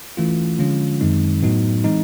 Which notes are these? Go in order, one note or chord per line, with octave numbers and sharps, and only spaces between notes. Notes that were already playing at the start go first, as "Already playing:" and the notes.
E3 A3 C#4 F4
D3 F3 G#3 C#4 F4
F#2 D#3 G#3 C4 D#4
A2 F#3 B3 D#4 F#4
E3 G#3 C4 D#4